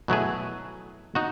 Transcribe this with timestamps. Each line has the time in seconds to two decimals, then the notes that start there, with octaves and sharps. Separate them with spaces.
0.08 B2 F#3 A3 E4 G#4
1.15 D#4 F#4